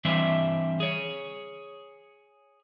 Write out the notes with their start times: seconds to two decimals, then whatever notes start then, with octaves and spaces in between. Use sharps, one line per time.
0.05 E3 G3 C4 D4 C5 E5
0.80 G#4 C#5